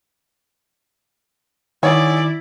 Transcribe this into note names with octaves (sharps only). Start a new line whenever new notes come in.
D#3 E4 F#4 G#4 C#5 D5